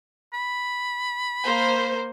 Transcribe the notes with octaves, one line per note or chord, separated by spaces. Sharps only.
B5
A#3 C5